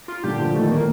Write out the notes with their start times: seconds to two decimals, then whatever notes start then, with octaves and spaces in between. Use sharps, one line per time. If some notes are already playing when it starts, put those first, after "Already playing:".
0.08 F4
0.23 A#2 D3 G4
0.39 D3 F3
0.54 D#3 G3 A3
0.71 A2 A#3